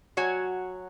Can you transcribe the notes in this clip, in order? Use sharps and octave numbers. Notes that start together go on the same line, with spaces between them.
F#3 F#4 C#5 G#5